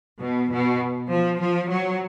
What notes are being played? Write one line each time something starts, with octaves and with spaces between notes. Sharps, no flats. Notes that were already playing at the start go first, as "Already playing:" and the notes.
B2
B2
F3
F3
F#3